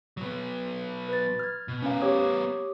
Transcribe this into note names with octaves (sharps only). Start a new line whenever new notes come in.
F#3 B3
B4 A6
F6 G#6
B2
B3 C#4 A#4 F5
G4 C#5 D#6